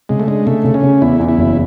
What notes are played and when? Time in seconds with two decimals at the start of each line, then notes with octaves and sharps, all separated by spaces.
0.09 C#3 G#3
0.20 A3
0.27 G#3 D4
0.47 C#3 A3
0.64 C#3
0.74 C#4
0.83 C#3
1.01 E2 E4
1.19 E2
1.29 E4
1.38 F#1